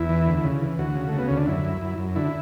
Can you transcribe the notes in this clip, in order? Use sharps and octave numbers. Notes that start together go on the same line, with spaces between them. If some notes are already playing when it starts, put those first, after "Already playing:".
Already playing: E2 E4
E3
D2
C#3
E3
D2 F#4
C#3
C#3 A3
B3
D2 C#4
D4
F#2 E4
F#2
F#2
F#2
D3 E4